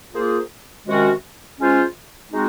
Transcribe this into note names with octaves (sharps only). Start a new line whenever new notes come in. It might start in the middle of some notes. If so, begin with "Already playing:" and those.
A#3 F4 G#4 C5
C3 D#3 G#3 C#4 F#4
G#3 C#4 F4 C5
G#3 C4 D#4 F#4